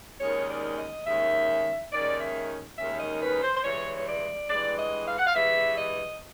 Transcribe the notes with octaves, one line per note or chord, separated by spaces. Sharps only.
D#2 D#3 G#3 C#4 C#5
D5
D#5
D#2 D#3 G#3 C#4 E5
D#2 D#3 G#3 C#4 D5
E5
D#2 D#3 G#3 C#4 E5
D#5
B4
C5
C5
G2 E3 G#3 C#5
C#5
D5
G2 E3 G#3 D5
D#5
F5
F#5
F5
G2 E3 G#3 E5
D#5